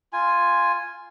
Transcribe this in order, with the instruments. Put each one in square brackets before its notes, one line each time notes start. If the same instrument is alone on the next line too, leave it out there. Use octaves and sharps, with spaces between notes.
[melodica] F4 G#5